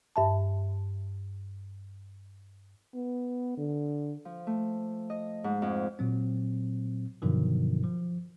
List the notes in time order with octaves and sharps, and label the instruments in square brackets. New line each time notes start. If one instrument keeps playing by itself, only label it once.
[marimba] G2 E5 A5
[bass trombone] B3
D3
[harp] F3
A3
D#5
G#2
F2
[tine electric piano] A#2 F#3 C4
G2 B2 D3 D#3 F3 F#3
F3